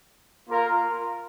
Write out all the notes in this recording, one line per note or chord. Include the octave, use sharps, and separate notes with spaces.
A#3 F4 A#4